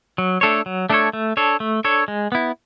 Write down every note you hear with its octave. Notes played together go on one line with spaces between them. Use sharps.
F#3
A3 D4 A4 C#5
F#3
A3 D4 A4 C#5
A3
D4 A4 C#5
A3
D4 A4 C#5
G#3
B3 E4